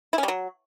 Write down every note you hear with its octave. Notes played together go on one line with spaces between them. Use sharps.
E4
C#4
G3
F#3